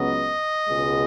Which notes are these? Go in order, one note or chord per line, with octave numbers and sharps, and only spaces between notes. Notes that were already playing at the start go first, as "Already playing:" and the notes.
Already playing: C#2 C#3 F#3 B3 D#5
C#2 B2 G#3